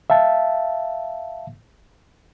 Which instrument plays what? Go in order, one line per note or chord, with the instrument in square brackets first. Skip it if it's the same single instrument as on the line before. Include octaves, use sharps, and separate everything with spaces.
[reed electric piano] E5 F5 A5